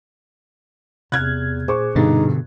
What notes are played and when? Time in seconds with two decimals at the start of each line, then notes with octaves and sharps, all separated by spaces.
1.12 E2 C3 F6 F#6 G#6
1.68 A#2 G#4 C5 C#6 D6
1.95 G2 B2 D3 D#4